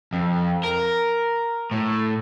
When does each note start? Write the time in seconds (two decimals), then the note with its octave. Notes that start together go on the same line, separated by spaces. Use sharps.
0.13 F2
0.64 A#4
1.71 A2